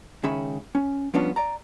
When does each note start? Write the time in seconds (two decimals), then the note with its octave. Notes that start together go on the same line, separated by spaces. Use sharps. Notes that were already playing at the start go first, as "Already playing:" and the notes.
0.23 C#2 D#3 C#4 G#4 E5 B5
0.75 C#4
1.14 F3 G3 B3 C#4 D4 F4
1.36 D5 A#5